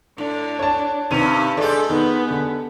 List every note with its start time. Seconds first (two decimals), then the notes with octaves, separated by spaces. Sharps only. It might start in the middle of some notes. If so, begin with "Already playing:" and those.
0.18 A2 D4
0.59 C#5 A5
1.11 G2 C3 D#3 C#4 D#7
1.57 G#3 D4 G4 A4 D5
1.90 D#3 B3
2.31 D3